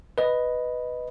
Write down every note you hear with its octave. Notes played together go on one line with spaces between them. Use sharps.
B4 D#5